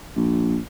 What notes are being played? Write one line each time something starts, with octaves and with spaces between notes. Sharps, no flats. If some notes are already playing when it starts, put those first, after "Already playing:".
A#1